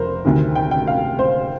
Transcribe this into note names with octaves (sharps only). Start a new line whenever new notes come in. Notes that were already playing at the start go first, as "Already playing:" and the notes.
Already playing: F1 A#4 C5
D2 C3 D#3
G5
G5
F5
C5